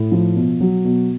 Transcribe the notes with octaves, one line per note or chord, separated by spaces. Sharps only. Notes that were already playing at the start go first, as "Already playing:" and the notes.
Already playing: A2
F3
B2
F#3
B2